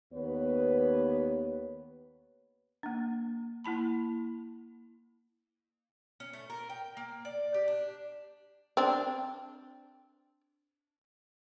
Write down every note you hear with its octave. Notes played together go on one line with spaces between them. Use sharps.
D#2 B3 B4 C#5
A#3 D4
A#3 E4 A5 B5
C#4
A3
A#4
G5
A#3
D5
G4
D4
C4 D4